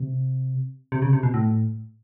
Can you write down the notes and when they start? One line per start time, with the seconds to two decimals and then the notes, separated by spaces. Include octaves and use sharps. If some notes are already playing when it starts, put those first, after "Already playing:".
Already playing: C3
0.92 C3
1.02 C#3
1.13 C3
1.23 B2
1.34 A2